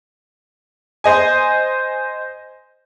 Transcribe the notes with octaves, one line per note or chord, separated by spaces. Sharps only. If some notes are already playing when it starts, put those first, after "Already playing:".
C5 D#5 G#5